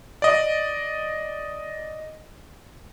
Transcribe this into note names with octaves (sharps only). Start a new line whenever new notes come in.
D5 D#5